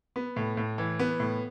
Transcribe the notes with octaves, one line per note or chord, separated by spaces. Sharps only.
B3
A2
A2
E3
B3
A2